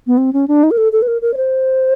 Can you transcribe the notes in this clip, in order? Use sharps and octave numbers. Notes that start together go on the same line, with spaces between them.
B3
C4
C#4
D4
D#4
A#4
A4
A4
B4
A#4
A#4
C#5
C5